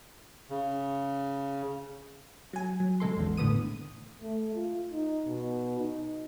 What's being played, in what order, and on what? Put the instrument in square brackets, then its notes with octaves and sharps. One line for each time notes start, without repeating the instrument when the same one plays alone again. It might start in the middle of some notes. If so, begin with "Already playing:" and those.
[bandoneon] C#3
[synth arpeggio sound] F#3 G#5
F#3
C#3 G#3 A4 C6
A1 E2 D#3
A2 D3 B3 D#6 D#7
[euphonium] A3
F4
D#4
B2
D#4